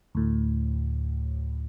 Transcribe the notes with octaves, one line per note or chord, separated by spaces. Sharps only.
D2 A2